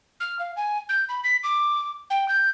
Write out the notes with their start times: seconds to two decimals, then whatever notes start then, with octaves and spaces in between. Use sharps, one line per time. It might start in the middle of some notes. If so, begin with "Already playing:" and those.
0.20 F6
0.39 F5
0.57 G#5
0.89 G6
1.09 B5
1.24 B6
1.44 D6
2.10 G5
2.29 G6